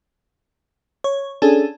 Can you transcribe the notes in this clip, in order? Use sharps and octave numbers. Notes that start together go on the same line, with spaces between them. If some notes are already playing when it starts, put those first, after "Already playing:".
C#5
C#4 D4 G#4 A4